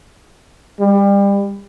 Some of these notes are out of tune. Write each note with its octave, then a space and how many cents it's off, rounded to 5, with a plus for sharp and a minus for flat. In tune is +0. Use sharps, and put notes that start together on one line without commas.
G3 +30